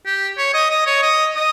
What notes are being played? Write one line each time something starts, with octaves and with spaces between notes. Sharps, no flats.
G4
C#5
D#5
D#5
C#5
D#5
D#5